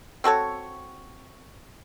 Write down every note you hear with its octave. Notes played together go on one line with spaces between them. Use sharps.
C4 F#4 A4 C#5